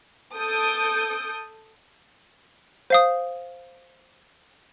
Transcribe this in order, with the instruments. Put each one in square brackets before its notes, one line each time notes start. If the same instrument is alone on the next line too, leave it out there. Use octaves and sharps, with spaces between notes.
[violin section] A4 D#6 G6 D7
[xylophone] C5 F5 D#6